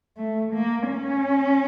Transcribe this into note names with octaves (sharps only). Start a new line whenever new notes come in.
A3
A#3
C#4